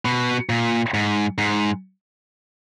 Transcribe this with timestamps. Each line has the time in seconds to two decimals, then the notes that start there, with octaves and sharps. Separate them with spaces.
0.05 B2
0.49 A#2
0.94 G#2
1.38 G#2